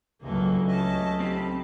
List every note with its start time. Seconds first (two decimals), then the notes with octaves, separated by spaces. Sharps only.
0.22 C#2 G2 D#3 E3 F#3 A#3 A4
0.68 A3 C#4 D#5 E5 A5
1.20 C4 D#4 G4 B5